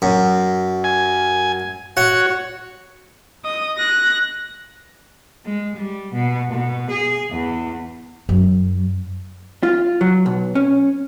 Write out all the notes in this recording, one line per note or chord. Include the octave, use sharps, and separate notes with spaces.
F#2
G#5
F#4 C#5 F#5
D#5 D#6
F#6 A#6
G#3
G3
B2
B2
G#4
E2
F#2 F#3
F4
F#3
B1
C#4